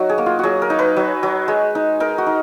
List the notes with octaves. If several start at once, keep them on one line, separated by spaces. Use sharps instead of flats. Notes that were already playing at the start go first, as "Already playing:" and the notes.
Already playing: F#3 D#4 F#4
G#4
A#3
F4
F#3 F#4 G#4
A#4
D#4
B4
F#3
F#3
G#3
D#4
D#4 A#4
F#4
D#4